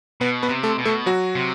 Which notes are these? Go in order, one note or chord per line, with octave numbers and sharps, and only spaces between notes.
B2 B3 B4
B3 B4
C3
A3 A4
B2
A3 A4
F#3 F#4
C3